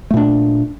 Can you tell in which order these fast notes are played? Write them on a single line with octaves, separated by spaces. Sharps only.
A3 A#2 D4